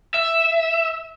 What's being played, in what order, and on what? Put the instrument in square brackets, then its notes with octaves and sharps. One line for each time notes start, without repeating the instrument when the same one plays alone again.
[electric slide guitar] E5